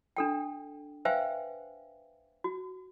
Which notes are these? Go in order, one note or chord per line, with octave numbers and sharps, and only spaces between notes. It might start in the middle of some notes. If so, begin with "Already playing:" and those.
D4 A4 G5
B4 C5 E5 F5 G5 G#5
F#4